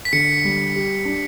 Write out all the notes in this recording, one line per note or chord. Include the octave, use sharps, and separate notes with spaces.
B6
D3 C#7
G3
G4
D4